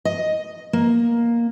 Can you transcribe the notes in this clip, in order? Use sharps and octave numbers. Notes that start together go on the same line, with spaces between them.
D#5
A#3